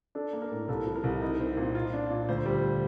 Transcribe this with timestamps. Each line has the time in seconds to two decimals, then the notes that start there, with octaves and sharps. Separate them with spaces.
0.15 D4 A4
0.33 A#3
0.42 A#4
0.52 A2
0.68 C2 A4
0.87 F3
0.96 A#4
1.04 C2
1.22 D#4 A#4
1.40 C4
1.57 A#2
1.75 F4
1.93 D4
2.10 A#2
2.29 D2 C5
2.46 G3